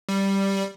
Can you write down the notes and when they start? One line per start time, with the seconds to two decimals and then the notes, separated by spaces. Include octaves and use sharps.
0.09 G3